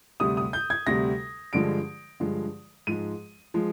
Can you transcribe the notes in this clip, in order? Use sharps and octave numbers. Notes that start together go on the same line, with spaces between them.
D2 C3 G3 D#6
D#6
G6
G#6
D2 C3 G3 A#6
G2 D3 F3 G#3 D7
G2 D3 F3 G#3
G#2 F3 G#3 D#7
F3 G#3